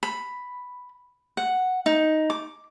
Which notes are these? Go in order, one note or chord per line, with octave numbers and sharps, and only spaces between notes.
B5
F#5
D#4
D6